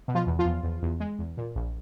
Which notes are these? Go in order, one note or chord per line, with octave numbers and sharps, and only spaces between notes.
B2
F3 F4
E2
F3 F4
E2
E2
E2
G#3
E2
A#2
A#1